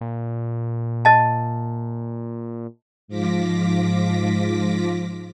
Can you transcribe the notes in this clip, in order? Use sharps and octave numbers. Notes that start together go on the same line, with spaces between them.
A#2
D#5 A5
G#2 F3 F4 D6 A#6 B6